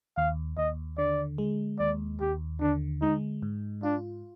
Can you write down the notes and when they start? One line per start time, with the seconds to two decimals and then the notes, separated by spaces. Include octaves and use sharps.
0.17 D#2 F5
0.58 D#2 D#5
0.98 D3 D5
1.38 G#3
1.79 D#2 D5
2.21 D#2 G4
2.61 D3 D4
3.02 G#3 D#4
3.42 G#2
3.83 D4 F4